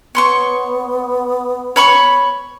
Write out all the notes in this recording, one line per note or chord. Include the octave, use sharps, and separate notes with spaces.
B3 C#5 C6 C#6
C#5 B5 C#6